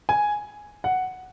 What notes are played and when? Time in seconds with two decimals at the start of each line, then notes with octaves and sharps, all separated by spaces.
0.09 G#5
0.84 F#5